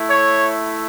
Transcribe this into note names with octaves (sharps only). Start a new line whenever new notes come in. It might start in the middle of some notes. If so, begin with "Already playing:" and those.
Already playing: A3 E4
C#5